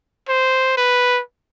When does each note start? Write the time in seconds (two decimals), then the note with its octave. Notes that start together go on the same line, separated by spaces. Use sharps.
0.29 C5
0.77 B4